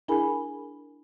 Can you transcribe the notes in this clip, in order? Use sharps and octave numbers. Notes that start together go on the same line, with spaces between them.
D4 E4 G#4 A#4 G#5 B5